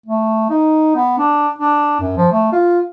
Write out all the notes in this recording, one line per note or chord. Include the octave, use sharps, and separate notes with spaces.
A3
D#4
B3
D4
D4
F#2
F3
A3
F4